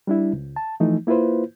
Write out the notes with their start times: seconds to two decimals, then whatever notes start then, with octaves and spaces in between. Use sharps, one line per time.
0.07 G3 D4 E4
0.33 C#2
0.56 A5
0.80 E3 F3 A3 D#4
1.07 A#3 E4 F4 B4 C5